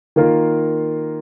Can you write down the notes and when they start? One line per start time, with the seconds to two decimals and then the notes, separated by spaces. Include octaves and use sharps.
0.16 D#3 A#3 F4 A#4